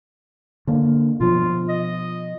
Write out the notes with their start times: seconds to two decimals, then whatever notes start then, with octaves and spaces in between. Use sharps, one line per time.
0.67 D3 A#3
1.20 B2 F3 F4
1.69 D#5